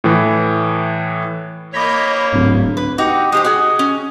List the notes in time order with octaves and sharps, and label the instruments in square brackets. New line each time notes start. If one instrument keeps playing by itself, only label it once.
[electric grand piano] A2 E3
[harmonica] A#3 C#5 [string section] D#5 B5 G6 [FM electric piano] D6 A#6 B6
[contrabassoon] D1 [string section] C2 [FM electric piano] G#2
[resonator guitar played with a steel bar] B4
[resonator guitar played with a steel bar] D#4 F#4 [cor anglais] G4
[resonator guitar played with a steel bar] G#3 G4 C5 [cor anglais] D#5
[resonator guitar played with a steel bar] F#4 G#4 [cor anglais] D#5
[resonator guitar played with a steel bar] C#4